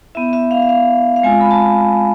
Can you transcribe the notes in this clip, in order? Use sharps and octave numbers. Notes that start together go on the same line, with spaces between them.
B3 E4 E5
E5
F5
E5
F5
F5
G#3 C4 F4 G#5
B5
A5